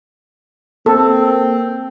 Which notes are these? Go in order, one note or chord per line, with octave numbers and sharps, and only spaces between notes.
A#3 C4 A4